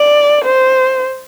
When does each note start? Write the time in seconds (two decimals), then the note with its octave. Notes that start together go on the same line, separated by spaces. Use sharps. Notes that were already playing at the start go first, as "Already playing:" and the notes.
Already playing: D5
0.45 C5